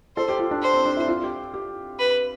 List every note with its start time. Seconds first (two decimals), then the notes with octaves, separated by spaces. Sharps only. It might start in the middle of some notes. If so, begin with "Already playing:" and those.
0.17 A4 C5
0.28 G4
0.39 F4
0.51 D4
0.62 C5
0.74 C4
0.85 D4
0.97 E4
1.08 F4
1.23 G4
1.54 G4
1.99 B4